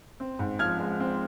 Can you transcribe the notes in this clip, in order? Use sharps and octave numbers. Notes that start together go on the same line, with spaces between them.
C4
G#2
F3 F6 G#6
G#3
C4